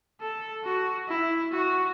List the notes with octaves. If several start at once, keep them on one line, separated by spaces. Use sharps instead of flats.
A4
F#4
E4
F#4